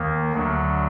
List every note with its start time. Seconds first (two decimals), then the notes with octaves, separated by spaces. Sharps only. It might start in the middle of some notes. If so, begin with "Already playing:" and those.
Already playing: D#2 D#3 A#3
0.32 D2 D3 F#3 D4